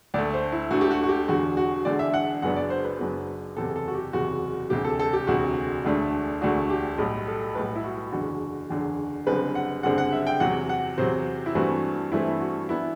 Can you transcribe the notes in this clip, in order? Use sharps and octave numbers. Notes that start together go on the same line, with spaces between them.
D2 D3 A3 D5
C5
E4
D2 D3 A3 F#4
G4
F#4
F#4
G4
E1 E2 D3 F#4
F#4
E1 E2 D3 D5
E5
F#5
F#1 F#2 F#3 B3 D4 F#5
D5
C5
B4
F#1 F#2 F#3 B3 D4
F#1 E2 C3 A4
A4
F#4
G4
F#1 E2 C3 F#4
E1 D2 C3 G4
A4
A4
G4
E1 D2 C3 F#4
E1 D2 D3 A3 D4
E1 D2 D3 A3 D4 F#4
G4
B1 A2 G3
A4
B1 A2 G3 B4
E4
F#4
F#1 E2 D3 F#3 F#4
F#1 E2 D3 F#3
F#1 F#2 D3 G3 C4 B4
F#5
F#1 F#2 D3 G3 C4 F#5
F#5
E5
G5
E2 C3 F#3 F#5
F#5
E2 C3 F#3 C5
E4
G2 E3 A3 C4 F#4
G2 E3 A3 C4 E4
F#4
E3 B3 D4 E4